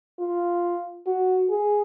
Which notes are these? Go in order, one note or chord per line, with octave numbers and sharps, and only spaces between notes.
F4
F#4
G#4